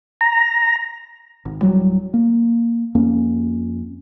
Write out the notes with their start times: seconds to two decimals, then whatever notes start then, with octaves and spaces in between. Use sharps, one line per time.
0.21 A#5
1.45 G#1
1.61 D1 D2 F#3 G3
2.14 A#3
2.95 F2 A#3 C#4